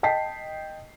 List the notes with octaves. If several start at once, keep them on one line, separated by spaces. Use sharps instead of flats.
D#5 G5 A5 B6 C7